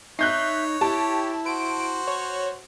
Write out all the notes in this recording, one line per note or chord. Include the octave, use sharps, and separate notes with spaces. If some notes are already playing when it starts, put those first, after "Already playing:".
D#4 C#5 E5 F#6 G6 C7
E4 G4 A5
F#4 C5 D7
C#5